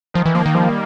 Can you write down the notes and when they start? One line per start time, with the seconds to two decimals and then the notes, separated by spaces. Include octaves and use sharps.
0.14 D#3 F3
0.26 E3
0.35 F3 A#3
0.46 D#3
0.55 F3 G3